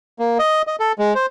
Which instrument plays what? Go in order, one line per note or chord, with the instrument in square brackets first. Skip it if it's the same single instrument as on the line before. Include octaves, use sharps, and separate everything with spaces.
[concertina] A#3
D#5
D#5
A4
G#3
C5